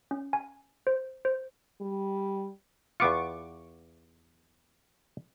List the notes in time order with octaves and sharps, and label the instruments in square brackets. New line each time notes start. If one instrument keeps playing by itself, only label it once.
[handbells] C#4
G#5
C5
C5
[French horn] G3
[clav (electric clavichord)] E2 B3 F4 [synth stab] C#6 D6